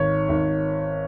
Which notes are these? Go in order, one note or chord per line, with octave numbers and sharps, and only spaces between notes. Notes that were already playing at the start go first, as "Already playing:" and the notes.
Already playing: G#1 D#3 C#5
G#1